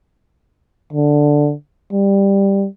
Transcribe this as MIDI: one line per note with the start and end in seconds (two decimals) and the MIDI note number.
0.93 1.53 50
1.92 2.66 55